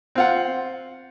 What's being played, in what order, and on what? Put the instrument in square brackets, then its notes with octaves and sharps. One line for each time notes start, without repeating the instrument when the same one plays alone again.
[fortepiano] C4 F4 F#5